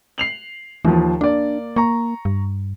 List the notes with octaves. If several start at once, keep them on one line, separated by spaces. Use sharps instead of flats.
C7 F7 F#7
D#2 E3 F3
A#3 D4 A#4 D5
A#3 A#5 C#6
G2